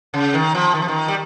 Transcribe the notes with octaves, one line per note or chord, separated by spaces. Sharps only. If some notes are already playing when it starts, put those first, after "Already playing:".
C#3
D#3
F3
D#3
F3
D#3
G3